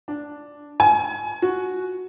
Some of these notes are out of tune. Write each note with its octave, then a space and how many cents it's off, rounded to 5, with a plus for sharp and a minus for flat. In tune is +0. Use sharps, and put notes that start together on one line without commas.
D4 -5
G#5 +25
F#4 -5